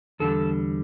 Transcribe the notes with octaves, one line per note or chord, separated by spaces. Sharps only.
E2 D3 G3 A4